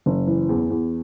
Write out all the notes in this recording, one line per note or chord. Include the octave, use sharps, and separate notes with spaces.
F#1
E3
E2
E2